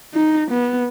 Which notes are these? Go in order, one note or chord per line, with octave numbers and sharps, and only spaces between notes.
D#4
B3